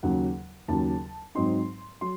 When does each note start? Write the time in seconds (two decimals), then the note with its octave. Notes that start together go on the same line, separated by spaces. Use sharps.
0.03 D#2 C#3 F#3 F#5
0.68 D#2 C#3 F#3 A5
1.35 G#2 F#3 C4 D#4 C6
2.01 F#3 C6